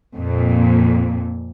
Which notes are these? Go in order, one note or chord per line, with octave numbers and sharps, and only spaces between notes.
F2 A#2